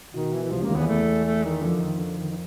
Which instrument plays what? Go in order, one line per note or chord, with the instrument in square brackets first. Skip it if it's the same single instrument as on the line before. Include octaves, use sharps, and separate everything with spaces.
[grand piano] B2 [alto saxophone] D#3
[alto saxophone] E3
E3
[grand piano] C2 C3 [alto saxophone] F3
[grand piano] C#2 C#3 [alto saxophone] A#3
[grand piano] D#2 D#3
[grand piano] E2 E3 [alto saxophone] B3
[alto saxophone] A3
A3
D#3
[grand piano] F2 F3 [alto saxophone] D3
[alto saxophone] D#3
D3
D#3
D#3